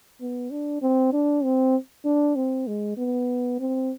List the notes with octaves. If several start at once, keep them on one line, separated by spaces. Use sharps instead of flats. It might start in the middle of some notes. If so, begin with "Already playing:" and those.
B3
D4
C4
D4
C4
D4
C4
G#3
B3
C4